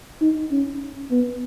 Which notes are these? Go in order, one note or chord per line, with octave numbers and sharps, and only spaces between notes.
D#4
C#4
B3